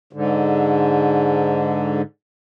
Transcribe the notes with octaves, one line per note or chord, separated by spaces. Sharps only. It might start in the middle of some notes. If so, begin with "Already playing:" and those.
G#2 D3